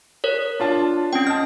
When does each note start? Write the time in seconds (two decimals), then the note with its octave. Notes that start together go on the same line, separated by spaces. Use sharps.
0.24 A#4 C#5
0.60 D4 F4 A5
1.13 C4 C#4 G5
1.27 D#5 A5 F6